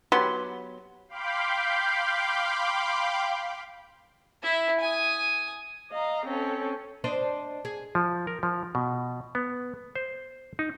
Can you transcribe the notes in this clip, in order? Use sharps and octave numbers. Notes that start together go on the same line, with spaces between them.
F#3 B3 G4 C6
F5 G5 B5 C6 D6 G6
E4 E5
G#5 D#6
D#5 F5 A#5
C4 C#4 A4
D4 C5 D#5
G#4
F3
A#4
F3
B2
B3
C5
D#4